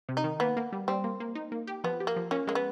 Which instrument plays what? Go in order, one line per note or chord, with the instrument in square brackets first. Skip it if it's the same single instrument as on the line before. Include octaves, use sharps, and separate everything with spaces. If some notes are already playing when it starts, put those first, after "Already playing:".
[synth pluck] C3
[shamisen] D#4
[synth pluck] D#3
[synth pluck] A#3 [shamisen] B3
[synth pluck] A#3
G3
[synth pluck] G3 [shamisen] C4
[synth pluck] A#3
A#3
D#4
A#3
G4
[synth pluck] F3 [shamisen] B3
[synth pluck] G4
[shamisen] A#3
[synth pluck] F3
[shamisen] A#3 [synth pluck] C#4
[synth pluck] G#3 [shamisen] A#3
[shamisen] B3